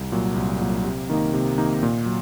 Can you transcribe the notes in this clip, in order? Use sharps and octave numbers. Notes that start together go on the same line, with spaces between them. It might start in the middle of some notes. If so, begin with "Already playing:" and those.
Already playing: C2
A#2 F#3
C2
A#2 F#3
C3
D#3 A#3 D#4
C3
D#3 A#3 D#4
A#2
F#3